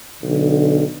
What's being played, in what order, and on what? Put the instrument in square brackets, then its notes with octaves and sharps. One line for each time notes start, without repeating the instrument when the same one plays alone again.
[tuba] B1 [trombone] D3